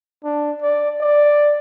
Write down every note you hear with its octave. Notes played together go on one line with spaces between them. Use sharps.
D4
D5
D5